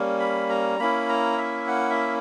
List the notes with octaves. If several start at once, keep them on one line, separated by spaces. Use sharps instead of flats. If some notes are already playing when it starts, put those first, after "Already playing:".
Already playing: G3 A#3 C#4
B5
A#5
A#3 C#4 E4 B5
A#5
E5
F#5
E5